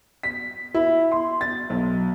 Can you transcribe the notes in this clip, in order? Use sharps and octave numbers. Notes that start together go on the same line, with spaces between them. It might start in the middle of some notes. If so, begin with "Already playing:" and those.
B6
E4
C6
A6
B1